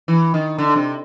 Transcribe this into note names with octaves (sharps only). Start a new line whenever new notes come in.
E3
D#3
D3
C3